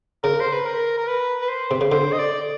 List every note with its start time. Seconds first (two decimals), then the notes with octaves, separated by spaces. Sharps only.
0.24 C#3 A#4
0.40 C5
0.53 B4
0.65 A#4
0.98 A#4
1.07 B4
1.42 B4
1.49 C5
1.71 C3
1.81 C#3
1.92 D3 C5
2.12 D#5
2.19 D5